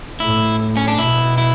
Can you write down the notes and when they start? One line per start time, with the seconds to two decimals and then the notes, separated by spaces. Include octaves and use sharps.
0.20 A2 E4
0.77 C#4
0.88 D4
0.99 B2 E4
1.38 E4